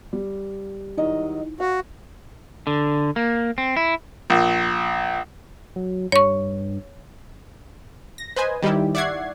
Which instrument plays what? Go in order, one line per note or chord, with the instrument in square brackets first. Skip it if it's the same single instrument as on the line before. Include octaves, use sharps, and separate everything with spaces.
[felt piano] G3
[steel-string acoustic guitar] D#3 F#3 D#5 [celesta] D#4 E4
[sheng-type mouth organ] F#4 [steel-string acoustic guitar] F5
[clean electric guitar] D3
A#3
C4
E4
[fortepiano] A#1
[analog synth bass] F#3
[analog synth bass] G2 [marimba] C#5 C#6
[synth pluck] A#6
B4 C5 D#5 G#5
D#3 G3 D#4 E4 G4
D5 E5 F#5 C#6 G#6 C7